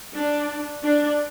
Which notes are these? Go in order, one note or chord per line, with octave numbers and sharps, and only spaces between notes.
D4
D4